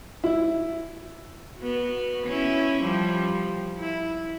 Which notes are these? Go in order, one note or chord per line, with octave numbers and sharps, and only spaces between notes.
E4
B3 F#4
C#4 E4
F3 G3
E4